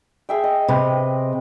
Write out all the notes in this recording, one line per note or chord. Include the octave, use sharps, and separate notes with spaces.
G#4 E5 G5
D#5
C3 B4